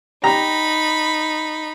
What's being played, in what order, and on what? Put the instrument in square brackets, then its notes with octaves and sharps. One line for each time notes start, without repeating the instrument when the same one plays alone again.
[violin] D#4 B5 [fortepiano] G4 A#5